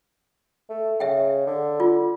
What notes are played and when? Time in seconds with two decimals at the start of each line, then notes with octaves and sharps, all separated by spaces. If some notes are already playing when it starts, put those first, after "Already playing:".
0.70 A3
1.00 C#3 E5 G5
1.47 D3
1.80 F4